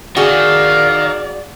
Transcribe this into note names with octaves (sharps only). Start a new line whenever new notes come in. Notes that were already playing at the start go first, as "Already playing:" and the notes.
D#3 F#4 G#4 D5 F5